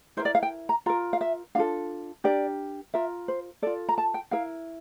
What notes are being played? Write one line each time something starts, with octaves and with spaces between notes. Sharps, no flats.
E4 A#4 C5
D5
F5
G5
A#5
F4 A#4 A#5
F5
E5
D4 F4 A4 F5
D4 G4 A#4 D5
F4 A#4 E5
C5
F4 A4 D5
A#5
A5
G5
E4 A#4 F5